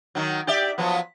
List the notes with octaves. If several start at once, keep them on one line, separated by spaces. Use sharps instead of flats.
D#3 F#3
G4 D5 E5
F3 F#3 B3